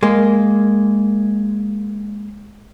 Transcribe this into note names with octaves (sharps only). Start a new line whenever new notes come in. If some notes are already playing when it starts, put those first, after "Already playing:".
G#3 A#3